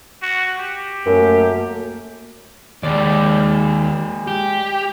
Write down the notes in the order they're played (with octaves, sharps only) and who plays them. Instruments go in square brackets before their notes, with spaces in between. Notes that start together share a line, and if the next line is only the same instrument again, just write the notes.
[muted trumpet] F#4
G4
[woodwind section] F#2 [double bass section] A3 A#3
[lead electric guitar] D#2 [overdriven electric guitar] G#3 D5
[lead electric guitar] G4